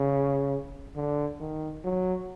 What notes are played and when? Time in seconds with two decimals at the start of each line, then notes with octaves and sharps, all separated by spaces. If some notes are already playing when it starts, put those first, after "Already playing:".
Already playing: C#3
0.96 D3
1.40 D#3
1.84 F#3